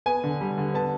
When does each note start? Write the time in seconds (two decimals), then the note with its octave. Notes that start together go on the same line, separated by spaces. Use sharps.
0.06 B3 G#5
0.24 D3
0.41 G3
0.58 D3
0.74 B3 A5